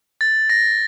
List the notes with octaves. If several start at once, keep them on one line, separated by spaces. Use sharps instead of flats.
A6
A#6